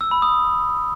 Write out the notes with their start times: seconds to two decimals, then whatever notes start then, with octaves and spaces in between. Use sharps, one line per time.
0.01 E6
0.11 B5
0.22 D#6